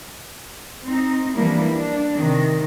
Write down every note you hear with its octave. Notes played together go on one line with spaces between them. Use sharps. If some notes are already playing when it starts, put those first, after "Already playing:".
C4 D#4
E3 F3 G3 A#3 D4 E4
D4
C3 D#3